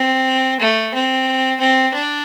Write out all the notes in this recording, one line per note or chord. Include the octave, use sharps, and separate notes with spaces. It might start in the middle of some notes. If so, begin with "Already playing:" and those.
Already playing: C4
A3
C4
C4
D4